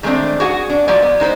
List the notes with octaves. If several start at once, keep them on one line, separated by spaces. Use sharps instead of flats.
D#3 G#3 A3 C4 D4
F#4 G#4 F#5
D4
F3 F#3 G#3 D5
B3
G#3 D#4 B4 C5